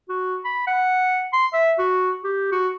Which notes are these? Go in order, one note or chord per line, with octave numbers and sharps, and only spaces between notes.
F#4
B5
F#5
C6
E5
F#4
G4
F#4